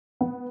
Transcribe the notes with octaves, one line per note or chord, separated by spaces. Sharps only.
B3